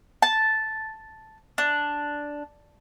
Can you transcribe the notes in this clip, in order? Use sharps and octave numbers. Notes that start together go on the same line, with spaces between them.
A5
D4